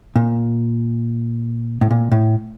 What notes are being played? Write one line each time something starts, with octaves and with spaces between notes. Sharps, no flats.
A#2
A2
A#2
A2